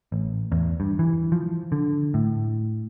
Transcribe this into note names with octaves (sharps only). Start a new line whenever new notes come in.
A1
E2
G2
E3
F3
D3
A2